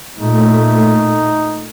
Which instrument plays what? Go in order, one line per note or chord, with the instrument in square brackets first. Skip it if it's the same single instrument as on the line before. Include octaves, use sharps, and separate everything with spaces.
[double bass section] A#2 A3 [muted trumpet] D#4